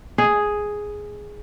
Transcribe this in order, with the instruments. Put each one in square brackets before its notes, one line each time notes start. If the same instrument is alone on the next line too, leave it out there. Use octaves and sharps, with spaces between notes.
[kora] G#4